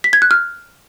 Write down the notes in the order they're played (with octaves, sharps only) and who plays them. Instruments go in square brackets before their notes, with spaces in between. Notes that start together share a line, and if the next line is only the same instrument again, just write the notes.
[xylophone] B6
G#6
F#6
F6